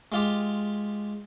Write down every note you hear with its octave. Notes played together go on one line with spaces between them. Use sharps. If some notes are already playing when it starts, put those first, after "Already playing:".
G#3 F4 G4